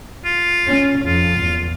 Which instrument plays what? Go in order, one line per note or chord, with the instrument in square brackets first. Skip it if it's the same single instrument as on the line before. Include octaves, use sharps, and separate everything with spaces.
[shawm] F4
[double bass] C#4
[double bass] F2 [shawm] F4
[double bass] E2